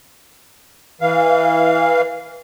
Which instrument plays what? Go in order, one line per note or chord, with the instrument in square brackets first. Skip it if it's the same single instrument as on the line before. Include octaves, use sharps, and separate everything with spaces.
[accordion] E3 F5